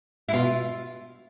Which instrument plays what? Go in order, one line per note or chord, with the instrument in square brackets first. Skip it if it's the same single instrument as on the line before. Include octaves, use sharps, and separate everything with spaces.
[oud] E4
[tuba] B2 [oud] F4